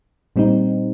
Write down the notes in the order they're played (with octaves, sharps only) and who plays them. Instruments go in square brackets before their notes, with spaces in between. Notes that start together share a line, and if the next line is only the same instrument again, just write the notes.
[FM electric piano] A#2 G3 C4 D#4